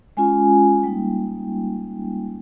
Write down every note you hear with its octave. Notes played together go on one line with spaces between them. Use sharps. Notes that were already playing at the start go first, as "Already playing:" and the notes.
G#3 C#4 F4 G#5
G3 A#3 D#4 G5